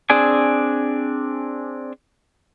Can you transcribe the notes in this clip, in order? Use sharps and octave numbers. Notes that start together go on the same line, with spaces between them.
C4 D4 G#4 D5 G#5